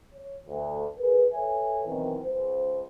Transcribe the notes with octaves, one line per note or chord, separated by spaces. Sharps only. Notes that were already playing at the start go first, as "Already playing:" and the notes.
C#5
D2
G#4 A#4 B4
A4 B4 C#5 E5 G#5
F#2 B2 D#3 E3 C4
C#2 C5